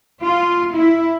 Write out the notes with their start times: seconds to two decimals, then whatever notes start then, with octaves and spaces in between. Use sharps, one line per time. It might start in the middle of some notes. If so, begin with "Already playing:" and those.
0.23 F4
0.74 E4